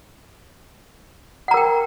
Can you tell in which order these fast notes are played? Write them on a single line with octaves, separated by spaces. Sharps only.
F#5 A#5 A#4 G5